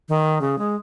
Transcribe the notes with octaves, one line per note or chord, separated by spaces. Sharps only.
D#3
C#3
G#3